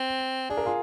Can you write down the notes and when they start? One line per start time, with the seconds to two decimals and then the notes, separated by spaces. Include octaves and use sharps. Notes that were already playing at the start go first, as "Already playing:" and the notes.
Already playing: C4
0.50 D4 G#4
0.57 A#4
0.66 F4 G#4